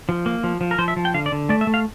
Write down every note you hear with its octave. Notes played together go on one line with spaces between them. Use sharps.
F3
A#3
F3
F3
A#4
F3 C5
E5
F3
G5
D3 F5
D5
D3
A3 D5
E5
A3
F5